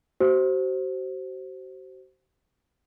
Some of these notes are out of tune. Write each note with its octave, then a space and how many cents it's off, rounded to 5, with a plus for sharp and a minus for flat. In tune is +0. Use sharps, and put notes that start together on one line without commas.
F#4 +45 C5 +0